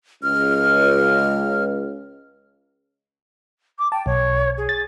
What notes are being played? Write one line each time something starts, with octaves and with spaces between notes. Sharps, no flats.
C#2 F6
D6
G5 A5
B1 C#5
G#4
A6